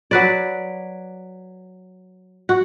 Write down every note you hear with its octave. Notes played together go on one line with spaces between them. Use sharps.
F#3 B4 D5
F#4